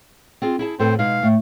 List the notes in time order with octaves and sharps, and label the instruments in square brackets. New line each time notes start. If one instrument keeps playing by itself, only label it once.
[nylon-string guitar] C4 F4 G#4
E4 G#4 A5
[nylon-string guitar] A2 A4 B4 [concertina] C4 C5
[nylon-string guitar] B2 G#3 D#4 [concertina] F5
[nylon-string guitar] A2 [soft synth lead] A3